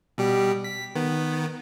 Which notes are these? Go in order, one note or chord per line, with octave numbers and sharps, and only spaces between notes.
B2 G3 G4
B6
D#3 B3